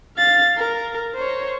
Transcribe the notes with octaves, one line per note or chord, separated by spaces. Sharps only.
F5 A6
A#4
C5 C#5